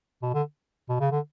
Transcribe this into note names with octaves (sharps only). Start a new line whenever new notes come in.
B2
D3
B2
C#3
D3